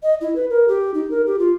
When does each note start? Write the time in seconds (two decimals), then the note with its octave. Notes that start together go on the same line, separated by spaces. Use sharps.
0.03 D#5
0.21 E4
0.35 B4
0.50 A#4
0.68 G4
0.94 D#4
1.10 A#4
1.26 G4
1.38 F4